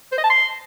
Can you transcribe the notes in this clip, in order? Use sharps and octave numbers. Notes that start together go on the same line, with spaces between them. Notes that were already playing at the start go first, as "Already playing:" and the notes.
C5
D#5
A5
C6